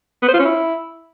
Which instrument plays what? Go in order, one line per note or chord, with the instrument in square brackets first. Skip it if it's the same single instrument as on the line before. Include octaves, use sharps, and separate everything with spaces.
[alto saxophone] B3
C5
F4
C#4
E4